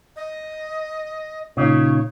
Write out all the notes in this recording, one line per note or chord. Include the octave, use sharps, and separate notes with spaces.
D#5
A#2 C#3 D#4 C#5